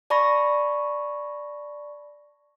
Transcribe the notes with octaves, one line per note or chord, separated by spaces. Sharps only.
D5 A5 B5 C#6 A#6